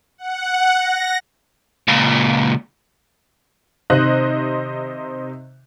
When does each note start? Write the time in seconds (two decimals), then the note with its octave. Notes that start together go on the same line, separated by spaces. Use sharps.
0.18 F#5
0.79 A#6
1.88 C#2 A#2
3.90 C3 D#3 C5 D#5 F#6